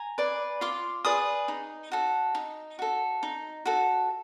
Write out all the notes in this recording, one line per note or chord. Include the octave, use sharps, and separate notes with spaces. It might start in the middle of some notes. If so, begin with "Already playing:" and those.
Already playing: G#5 A#5
G#4 B4 D5
F4 C6 D6
G#4 B4 D5 D#6
D#4
F#4 A4
D#4
F#4 A4
D#4
F#4 A4